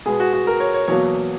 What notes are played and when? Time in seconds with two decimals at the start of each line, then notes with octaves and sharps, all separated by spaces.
0.06 B2 G#3 B3 G#4
0.20 F#4
0.33 F#4
0.47 A#4
0.60 C#5
0.74 C#5
0.88 E2 B2 F#3 A#3 C#5